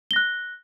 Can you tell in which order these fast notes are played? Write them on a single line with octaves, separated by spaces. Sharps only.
G7 A#6 F#6